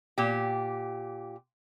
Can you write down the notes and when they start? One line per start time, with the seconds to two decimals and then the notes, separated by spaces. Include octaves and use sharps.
0.18 A#2 G4